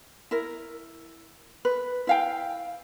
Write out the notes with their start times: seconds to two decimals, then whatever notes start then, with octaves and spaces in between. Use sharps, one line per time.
0.31 E4 A#4
1.65 B4
2.07 E4 F5 G5